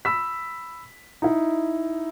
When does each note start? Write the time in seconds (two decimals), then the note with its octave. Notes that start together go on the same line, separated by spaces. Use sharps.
0.05 B5 E6 B6
1.22 D#4 E4